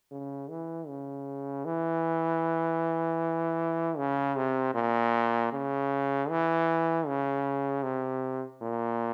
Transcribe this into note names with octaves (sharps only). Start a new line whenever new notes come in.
C#3
E3
C#3
E3
C#3
C3
A#2
C#3
E3
C#3
C3
A#2